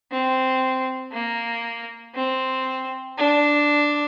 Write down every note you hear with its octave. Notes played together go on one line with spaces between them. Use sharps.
C4
A#3
C4
D4